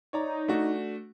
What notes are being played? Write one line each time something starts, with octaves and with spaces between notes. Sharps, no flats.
D#4 C#5 D5 A#5
A3 D4 F#4